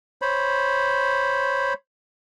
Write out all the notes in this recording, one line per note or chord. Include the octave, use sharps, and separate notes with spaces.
C5 C#5 B5